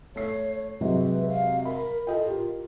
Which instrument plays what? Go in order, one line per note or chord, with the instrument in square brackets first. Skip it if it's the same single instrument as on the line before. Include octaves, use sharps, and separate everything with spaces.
[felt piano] A3 C7 [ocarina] C#5
[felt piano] C3 F#3 G#3 [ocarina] B4
[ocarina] F5
[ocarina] A#4 [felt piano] B5
[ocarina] F4 [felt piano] A4 D#5 G5
[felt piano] G4 A#4